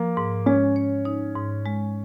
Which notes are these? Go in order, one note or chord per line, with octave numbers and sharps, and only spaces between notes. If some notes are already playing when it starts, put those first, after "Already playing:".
Already playing: F3 A#3
G#2
G#3 C#4
C#5
D#4
G#2
G#3